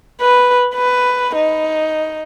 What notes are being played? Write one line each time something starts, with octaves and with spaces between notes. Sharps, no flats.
B4
B4
D#4